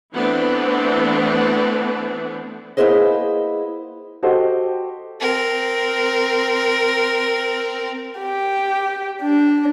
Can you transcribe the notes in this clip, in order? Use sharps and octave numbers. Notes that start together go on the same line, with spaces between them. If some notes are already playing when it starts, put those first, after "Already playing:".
E3 A3 B3 C4 D4
A#3 B3 E4 G#4 C5 D#5
F#4 G4 A4 C5 D#5
C4 A#4
G4
D4